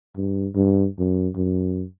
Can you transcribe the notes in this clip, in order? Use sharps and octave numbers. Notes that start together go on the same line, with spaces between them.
G2
G2
F#2
F#2